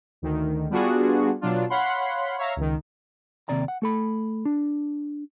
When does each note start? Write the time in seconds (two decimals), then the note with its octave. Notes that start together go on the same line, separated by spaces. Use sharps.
0.22 D2 D#3
0.70 G3 B3 D4 F4 F#4 G#4
1.41 B2 F#3 D4 F4
1.70 C#5 F5 F#5 B5 C6
2.39 C#5 E5 F5 A#5
2.56 C#2 D#3
3.49 D#2 C3 D5 A#5
3.68 F#5
3.82 A3 A4 B5
4.45 D4